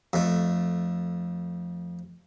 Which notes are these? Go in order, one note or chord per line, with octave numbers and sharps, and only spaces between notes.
F2 A3